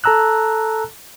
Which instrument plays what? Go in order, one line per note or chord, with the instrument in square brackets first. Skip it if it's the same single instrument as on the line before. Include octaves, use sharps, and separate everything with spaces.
[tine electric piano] A4 A5 A#5 E6 F#6